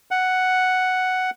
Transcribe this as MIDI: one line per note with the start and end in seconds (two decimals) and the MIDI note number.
0.11 1.30 78